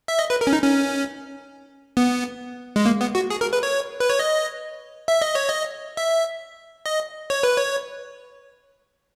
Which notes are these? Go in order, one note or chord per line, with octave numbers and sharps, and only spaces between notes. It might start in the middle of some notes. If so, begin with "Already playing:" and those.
E5
D#5
B4
A#4
C#4
D#4
C#4
B3
G#3
A#3
B3
F#4
G#4
A#4
B4
C#5
B4
C#5
D#5
E5
D#5
C#5
D#5
E5
D#5
C#5
B4
C#5